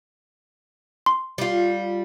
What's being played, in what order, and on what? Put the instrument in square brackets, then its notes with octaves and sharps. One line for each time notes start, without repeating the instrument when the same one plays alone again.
[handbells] C6
[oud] G3 F4